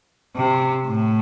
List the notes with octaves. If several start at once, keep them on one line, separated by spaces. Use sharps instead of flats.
C3
A2